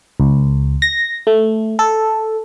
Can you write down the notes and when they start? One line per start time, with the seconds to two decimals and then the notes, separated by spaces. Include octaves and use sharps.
0.20 C#2
0.82 A#6
1.27 A3
1.79 A4